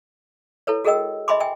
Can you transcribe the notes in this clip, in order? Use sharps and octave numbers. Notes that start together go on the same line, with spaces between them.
E4 A4 B4 C#5
F#4 G#4 A#4 D#5 G5 E6
D#5 E5 G#5 B5 C6 D6
E5 G5 G#5